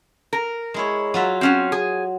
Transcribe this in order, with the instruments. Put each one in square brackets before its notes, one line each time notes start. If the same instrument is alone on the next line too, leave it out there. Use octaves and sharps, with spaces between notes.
[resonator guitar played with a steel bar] A#4
[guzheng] G#3 E4 C#5
F#3 F4 E5
[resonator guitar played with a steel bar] C4 C#4 F#4
G#4